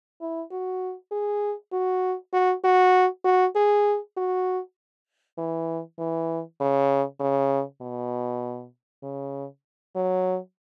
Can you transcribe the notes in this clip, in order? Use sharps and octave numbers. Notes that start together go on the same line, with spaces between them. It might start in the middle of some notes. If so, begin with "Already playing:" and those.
E4
F#4
G#4
F#4
F#4
F#4
F#4
G#4
F#4
E3
E3
C#3
C#3
B2
C#3
F#3